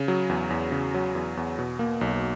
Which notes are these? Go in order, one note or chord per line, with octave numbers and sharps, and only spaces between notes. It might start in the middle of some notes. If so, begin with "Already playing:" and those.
Already playing: C#3
F#3
E2
E2
C#3
F#3
E2
E2
B2
A#3
B1